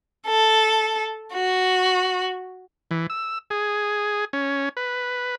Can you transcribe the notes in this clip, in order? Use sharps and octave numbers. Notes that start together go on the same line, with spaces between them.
A4
F#4
E3
E6
G#4
C#4
B4